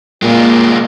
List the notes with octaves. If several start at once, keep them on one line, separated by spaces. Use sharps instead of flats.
A#2 G#3 A#3 F4